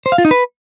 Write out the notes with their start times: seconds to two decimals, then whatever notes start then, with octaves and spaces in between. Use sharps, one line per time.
0.06 C5
0.12 F5
0.18 F4
0.25 D#4
0.31 B4